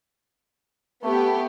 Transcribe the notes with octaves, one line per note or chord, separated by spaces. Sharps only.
A3 B3 G4